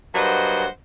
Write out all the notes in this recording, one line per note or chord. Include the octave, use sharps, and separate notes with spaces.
G2 F#3 A#3 C5 D#5 F#5